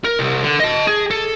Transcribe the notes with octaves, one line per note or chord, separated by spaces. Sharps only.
A#4
C2
D3
D#5 A5
G#4
A4